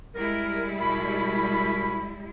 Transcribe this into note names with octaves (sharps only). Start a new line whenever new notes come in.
G3 G#3 E4 A#4
B2 A#4 B5